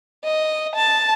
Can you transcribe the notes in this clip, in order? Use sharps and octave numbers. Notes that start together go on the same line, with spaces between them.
D#5
A5